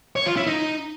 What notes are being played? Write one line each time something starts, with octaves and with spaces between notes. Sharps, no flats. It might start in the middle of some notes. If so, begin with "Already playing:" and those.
C#5
F4
E4
D#4